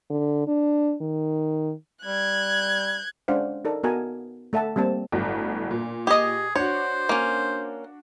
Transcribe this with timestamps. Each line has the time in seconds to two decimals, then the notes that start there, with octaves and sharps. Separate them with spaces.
0.10 D3
0.47 D4
1.01 D#3
2.05 G3 F#6 G#6
3.28 G#3 C#4 D4 C5 F5 F#5
3.65 D#4 A4 A#4 D5
3.84 B3 F#4 A#4 D#5 G#5 A5
4.53 A3 A4 E5 F#5 A5
4.76 G3 A#3 C4 A5
5.12 G1 A2 F#3
5.71 A#2
6.07 G4 G#4 D#5
6.56 D4 F#4 C5 C#5
7.09 A#3 C#4